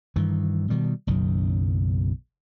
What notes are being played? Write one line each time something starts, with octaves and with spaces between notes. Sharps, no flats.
G2 D#3 E3
B2 D#3 G3
F#1 B1 F#2 D#3